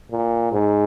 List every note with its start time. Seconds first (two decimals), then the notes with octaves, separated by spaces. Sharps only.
0.11 A#2
0.53 G#2